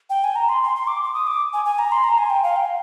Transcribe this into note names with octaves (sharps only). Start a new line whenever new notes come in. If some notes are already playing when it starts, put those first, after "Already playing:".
G5
G#5
A#5
C6
C6
C6
D6
D6
D#6
D6
G#5
G#5
A#5
C6
A#5
G#5
G5
F5
G5